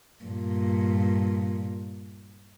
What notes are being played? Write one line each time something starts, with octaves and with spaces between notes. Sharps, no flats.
G2 A#2